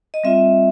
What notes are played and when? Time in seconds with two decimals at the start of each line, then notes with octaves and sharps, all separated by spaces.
0.14 D#5
0.24 G3 C4 F4 E5